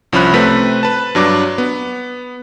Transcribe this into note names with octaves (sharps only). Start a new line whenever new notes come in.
C2 F3 C#4 E4 B5 F#6
C3 A3 C4 B4 B6
B4 A5
G2 F#3 D4 D6
B3